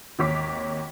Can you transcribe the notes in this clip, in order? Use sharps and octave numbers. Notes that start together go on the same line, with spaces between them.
G#1 D#2 C#5 D6 B6